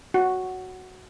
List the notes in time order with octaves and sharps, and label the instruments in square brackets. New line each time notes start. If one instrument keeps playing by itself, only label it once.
[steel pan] F#4